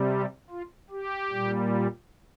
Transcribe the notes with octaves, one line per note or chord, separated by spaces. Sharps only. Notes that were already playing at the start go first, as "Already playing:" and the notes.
Already playing: C3 G3
G4
F4
G4
A#2 G3